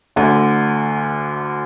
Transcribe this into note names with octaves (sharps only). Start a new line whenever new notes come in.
D2 D3